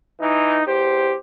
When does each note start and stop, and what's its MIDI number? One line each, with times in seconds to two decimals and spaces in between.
0.21 0.61 52
0.21 0.61 63
0.67 1.15 40
0.67 1.15 67
0.67 1.15 72